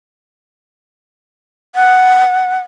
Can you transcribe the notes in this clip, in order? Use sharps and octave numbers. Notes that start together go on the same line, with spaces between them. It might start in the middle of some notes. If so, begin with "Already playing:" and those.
F#5